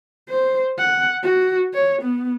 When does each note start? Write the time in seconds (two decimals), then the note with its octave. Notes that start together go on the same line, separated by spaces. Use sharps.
0.29 C5
0.78 F#5
1.23 F#4
1.74 C#5
2.02 B3